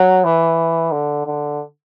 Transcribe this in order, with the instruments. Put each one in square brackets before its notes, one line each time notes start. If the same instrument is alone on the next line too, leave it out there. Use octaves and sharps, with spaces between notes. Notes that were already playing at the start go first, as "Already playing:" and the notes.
Already playing: [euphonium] F#3
E3
D3
D3